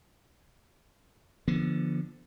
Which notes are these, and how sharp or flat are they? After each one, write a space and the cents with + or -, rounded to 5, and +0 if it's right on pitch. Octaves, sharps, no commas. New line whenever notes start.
D3 +0 F3 -25 B3 -35